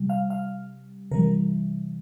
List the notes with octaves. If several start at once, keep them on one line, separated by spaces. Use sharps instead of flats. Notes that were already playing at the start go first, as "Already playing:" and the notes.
Already playing: C3 G3
F5
F5
C3 E3 G3 A#4